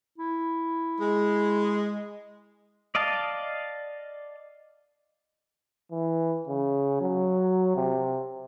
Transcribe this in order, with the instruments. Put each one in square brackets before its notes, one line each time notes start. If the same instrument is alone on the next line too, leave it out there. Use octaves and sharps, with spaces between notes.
[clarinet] E4
[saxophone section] G#3
[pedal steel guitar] D5 D#5 F5 A5
[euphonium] E3
C#3
F#3
C3